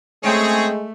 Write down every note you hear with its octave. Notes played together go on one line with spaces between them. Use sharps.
G#3 A3 C4 C#4 G#4